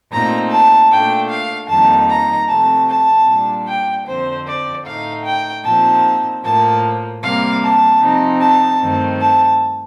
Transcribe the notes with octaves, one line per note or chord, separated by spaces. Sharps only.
A#2 A3 C4 D#4 A#5
A5
A#2 A3 D4 G5
F5
F2 D#3 G3 A#3 D#4 A5
A#5
C3 F3 A3 A5
A5
A#2 G3 D4
G5
F2 D3 F3 C4 C5
D5
A2 A3 D#4 F5
G5
A#2 F3 C4 D#4 A5
A2 F3 A#3 A5
C3 G3 A#3 F5
A5
C3 F3 C4 D#4
A5
G2 D#3 A3 C4
A5